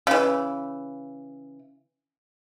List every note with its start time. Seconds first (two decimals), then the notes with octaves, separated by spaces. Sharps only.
0.07 C#3 E3